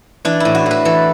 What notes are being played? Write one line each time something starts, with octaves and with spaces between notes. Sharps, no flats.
E3 D4
A2 E4
F#4
A2 B4
E3 A4